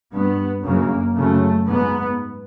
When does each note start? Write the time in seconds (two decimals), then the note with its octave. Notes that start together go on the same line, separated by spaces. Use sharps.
0.13 G2 B3
0.65 F#2 C#3 A#3
1.16 F#2 C#3 A3
1.68 G#2 B3